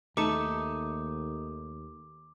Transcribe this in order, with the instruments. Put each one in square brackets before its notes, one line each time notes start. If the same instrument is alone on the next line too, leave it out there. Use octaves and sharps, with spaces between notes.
[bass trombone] D#2 [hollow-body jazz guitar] A3 A4 [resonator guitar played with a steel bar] D#4 [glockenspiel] D6